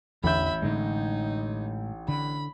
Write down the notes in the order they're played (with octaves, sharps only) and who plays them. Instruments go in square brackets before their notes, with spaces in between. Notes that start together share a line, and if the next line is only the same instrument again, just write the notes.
[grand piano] A1 G6 [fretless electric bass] E2 D3 [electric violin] E5 B5
[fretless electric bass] A2 D3 G#3 [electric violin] D#4
[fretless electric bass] D3 [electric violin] B5